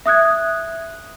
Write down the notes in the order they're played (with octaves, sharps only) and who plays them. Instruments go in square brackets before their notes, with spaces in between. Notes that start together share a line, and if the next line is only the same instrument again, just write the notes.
[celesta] E5 D#6 F#6 G#6